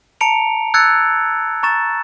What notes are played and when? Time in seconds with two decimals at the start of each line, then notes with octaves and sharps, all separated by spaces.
0.21 A5 A#5 C#7 D7 F7
0.74 E6 F#6 G#6 A6 C#7
1.63 A#5 C#6 A6 E7